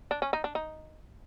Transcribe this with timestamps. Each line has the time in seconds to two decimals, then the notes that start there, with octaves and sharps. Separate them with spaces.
0.11 D4
0.22 C#4
0.33 D#4
0.44 D4
0.55 D#4